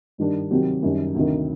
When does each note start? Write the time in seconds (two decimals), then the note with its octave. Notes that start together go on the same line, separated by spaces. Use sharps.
0.18 G2 D#3 G3 D4
0.51 C3 D#3 F#3 C4 G4
0.83 F#2 D#3 G3 D4
1.14 D2 C3 D#3